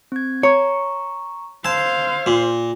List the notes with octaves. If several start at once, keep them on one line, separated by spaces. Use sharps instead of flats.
C4 G#6
C#5 A#5 C#6
C5 F5 A5 E6 G#6
A#2